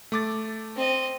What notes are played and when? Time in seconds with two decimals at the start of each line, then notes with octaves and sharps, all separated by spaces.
0.12 A3 D6 A6
0.76 C4 D#5